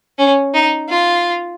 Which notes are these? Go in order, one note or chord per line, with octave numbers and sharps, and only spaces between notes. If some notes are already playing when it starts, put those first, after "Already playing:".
C#4
D#4
F4